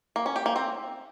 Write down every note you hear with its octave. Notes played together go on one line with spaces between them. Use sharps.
A#3
C#4
G4
A#3
C4